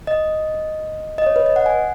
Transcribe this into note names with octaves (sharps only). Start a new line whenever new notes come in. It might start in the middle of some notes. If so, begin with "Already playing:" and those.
D#5
D#5
C#5
B4
D#5
F#5
G#5